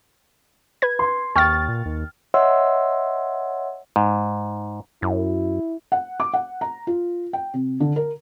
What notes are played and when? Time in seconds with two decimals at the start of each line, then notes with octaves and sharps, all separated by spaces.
0.82 B4 G#6
0.99 C6
1.36 D#2 G5 C#6 F6 A6
1.69 A#2
1.85 D#2
2.34 C#5 D#5 E5 F#5 C6 E6
3.96 G#2
5.02 F#2 E4
5.92 F#5
6.20 D6
6.33 F#5
6.61 A#5
6.87 F4
7.33 G5
7.54 C3
7.80 D3
7.96 A#4